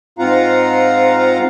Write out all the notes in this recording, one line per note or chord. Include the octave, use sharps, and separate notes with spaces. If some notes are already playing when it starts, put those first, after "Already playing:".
G#2 C4 F4 F5 F#5 A#5